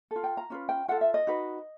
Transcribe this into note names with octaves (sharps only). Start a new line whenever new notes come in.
F4 A4
G5
A#5
C#4 F4 B4
G5
F4 A4 F#5
E5
D#5
D#4 F#4 B4